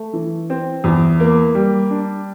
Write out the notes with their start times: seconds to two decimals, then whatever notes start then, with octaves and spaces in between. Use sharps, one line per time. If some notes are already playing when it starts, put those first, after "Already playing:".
Already playing: A3
0.13 E3
0.50 C4
0.84 E2
1.20 A#3
1.55 G3
1.90 D4